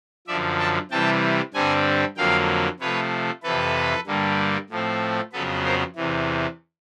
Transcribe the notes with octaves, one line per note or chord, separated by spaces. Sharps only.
F#2 D3 F3 D5 E5
G5 A5
C3 E3 G3 G5 A5
G2 D3 G3 C4 F#5 G#5
F2 D3 F#3 A#3 F5 G5
C3 F3 A3 B4 C#5
F2 C3 E3 A4 B4
G2 D3 G3 A#3
A2 F3 A3 C4
F2 C#3 F#3 B3 A4 B4
A#4 C5
E2 C3 E3